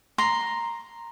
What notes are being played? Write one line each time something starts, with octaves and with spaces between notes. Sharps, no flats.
A#5 C6